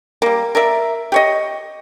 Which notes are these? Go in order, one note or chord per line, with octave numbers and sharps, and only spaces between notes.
G3 A#3
A#4 D5 E5
G4 C#5 D#5